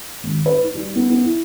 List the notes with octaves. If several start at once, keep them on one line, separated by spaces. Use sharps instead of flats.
G#1
B4
D#4
G3
B3
B3
E4